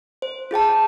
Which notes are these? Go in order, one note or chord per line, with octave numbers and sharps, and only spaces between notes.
C5
F4 G#4 G5 A5